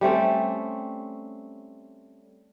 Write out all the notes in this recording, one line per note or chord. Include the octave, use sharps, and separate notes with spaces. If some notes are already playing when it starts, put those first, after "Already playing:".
G3 A3 C4 C#4